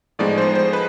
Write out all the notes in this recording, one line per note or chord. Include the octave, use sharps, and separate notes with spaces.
A2 F3 G#3 B3 D#4 D5
C5
C5
B4